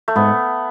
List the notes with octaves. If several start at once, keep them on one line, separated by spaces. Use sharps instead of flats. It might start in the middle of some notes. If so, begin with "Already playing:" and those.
A3
G#2 B3